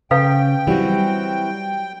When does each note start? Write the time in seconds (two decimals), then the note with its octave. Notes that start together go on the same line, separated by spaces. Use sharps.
0.11 C#3 A4 B4 F5 G5
0.67 E3 F#3 G3 C4 F#4